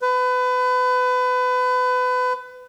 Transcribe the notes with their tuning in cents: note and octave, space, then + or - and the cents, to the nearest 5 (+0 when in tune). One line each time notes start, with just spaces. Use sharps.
B4 +30